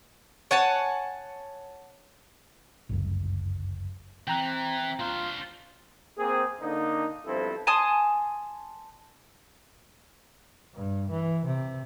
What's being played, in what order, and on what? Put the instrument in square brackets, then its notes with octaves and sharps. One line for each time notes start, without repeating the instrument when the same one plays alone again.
[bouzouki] C#5 F#5 G#5 A5
[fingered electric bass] G1 C#2 F#2
[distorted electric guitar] E3 [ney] C4 [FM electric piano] G5 A#5 F#6
[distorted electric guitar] D4 C5 [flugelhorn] F4
[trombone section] A#3 C4 G#4
D3 A#3 D#4
B1 G2 F3 C4 E4 A4
[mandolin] G#5 A5 C6 D#6
[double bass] G2
E3
C3